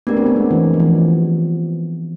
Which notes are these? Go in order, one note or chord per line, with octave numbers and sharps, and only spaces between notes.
A3 B3 D4 G4 A#4 D5
C4
B3
G#3
E3
F3
E3